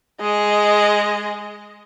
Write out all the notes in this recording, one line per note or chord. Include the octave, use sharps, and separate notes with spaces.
G#3 D#5